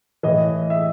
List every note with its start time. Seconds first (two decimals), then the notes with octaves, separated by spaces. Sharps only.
0.23 A2 E3 D#5
0.70 E5